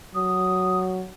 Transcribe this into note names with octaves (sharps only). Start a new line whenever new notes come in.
F#3 D#6